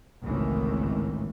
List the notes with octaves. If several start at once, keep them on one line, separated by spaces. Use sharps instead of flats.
G#1 C#2 A2 D#3 E3